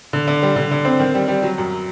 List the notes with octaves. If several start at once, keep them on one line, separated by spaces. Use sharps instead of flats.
D3
D3
G3
D3
D3
C4
D#3
G3
G3
F#3
F#2